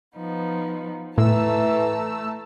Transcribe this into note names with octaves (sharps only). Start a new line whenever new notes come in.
F3 B3 D#4
A2 E3 A3 A5 A#5 E6